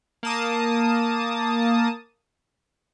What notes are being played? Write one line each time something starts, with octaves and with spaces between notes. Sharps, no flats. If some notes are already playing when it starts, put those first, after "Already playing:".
A#3 A5 D#6